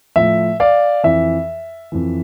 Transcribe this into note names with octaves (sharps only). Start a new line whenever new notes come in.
A2 F3 E5
D5 F5
F2 E3 E5
F2 E3